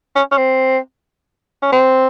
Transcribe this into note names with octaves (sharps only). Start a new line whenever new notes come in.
C#4
C#4
C4
C#4
C4